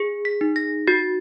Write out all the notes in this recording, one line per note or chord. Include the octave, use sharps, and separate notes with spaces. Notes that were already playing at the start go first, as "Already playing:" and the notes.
Already playing: G#4
B6
D#4
A#6
F#4 A6